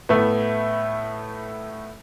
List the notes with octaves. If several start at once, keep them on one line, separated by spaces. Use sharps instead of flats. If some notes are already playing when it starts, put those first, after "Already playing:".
A2 A3 B3